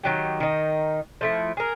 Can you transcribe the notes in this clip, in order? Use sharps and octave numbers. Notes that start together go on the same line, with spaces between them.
D#3 F#3 G4
D#3 D#4
F3 A3 E4
G#4 A#4